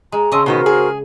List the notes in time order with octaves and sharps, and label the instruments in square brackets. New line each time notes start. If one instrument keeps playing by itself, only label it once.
[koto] G#3 [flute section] A#5
[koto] C#3 D#5 [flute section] A5 C6 E6
[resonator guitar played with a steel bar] B2 D#3 B3 [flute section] F#4 A#4 C5
[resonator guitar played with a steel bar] G#4